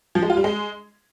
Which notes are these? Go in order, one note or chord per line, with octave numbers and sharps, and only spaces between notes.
F3
G#3
F4
G3
G#3